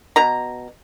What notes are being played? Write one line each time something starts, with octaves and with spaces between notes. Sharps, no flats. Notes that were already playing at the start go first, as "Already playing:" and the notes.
B2 A#5